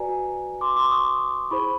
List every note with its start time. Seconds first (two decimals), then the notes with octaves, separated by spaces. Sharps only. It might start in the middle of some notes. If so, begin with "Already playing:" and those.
Already playing: F#4 B4 D5 G#5 A#5
0.61 C6 D6
0.76 C6 D6
0.91 C#6 D#6
1.51 E4 G#4 C5 B5 C#6